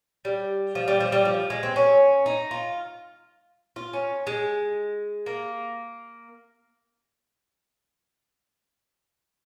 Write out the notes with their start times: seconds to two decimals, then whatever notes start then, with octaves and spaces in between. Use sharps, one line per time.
0.25 G3
0.75 F3
0.88 G3
1.00 F3
1.12 G3
1.25 F3
1.50 G#3
1.63 C4
1.76 C#4
2.26 D#4
2.51 F4
3.76 F4
3.93 C#4
4.27 G#3
5.26 A#3